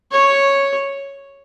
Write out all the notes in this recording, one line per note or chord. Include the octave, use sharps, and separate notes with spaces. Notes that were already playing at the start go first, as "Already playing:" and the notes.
C#5